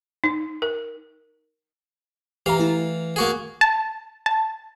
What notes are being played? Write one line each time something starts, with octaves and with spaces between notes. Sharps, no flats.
D#4
A#4
E3 G4 F5 A#5
A3 E4
A#3 F#4 G#4
A5
A5